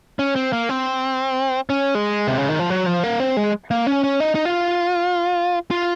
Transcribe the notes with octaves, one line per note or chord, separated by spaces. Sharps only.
C#4
C4
A#3
C4
C#4
G#3
C3
C#3
D#3
F3
F#3
F3
A#3
C4
G#3
A#3
C#4
C#4
D#4
D#4
F4
F4